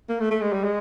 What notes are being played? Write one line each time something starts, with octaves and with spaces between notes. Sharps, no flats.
A#3
A3
A3
G#3
G3
G#3